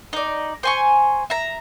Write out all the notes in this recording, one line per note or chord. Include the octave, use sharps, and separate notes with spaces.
D#4 D5
C5 G#5 C#6
E5 A#5